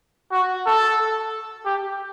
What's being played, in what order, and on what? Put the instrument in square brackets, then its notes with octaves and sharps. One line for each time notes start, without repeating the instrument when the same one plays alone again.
[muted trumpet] F#4
A4
G4